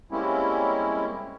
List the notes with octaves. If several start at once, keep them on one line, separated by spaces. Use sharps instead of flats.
G3 G#3 A#3 C4 C#4 E4